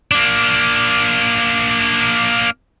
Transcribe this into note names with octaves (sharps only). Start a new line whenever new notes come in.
A#3 D4